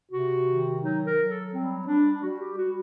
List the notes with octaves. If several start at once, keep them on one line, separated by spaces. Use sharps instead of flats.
C3 F#4
D#3
F#3 D#4
A#4
F#3
A4
G3 C4
G3 D4
G3 F#4
G4
G3 F#4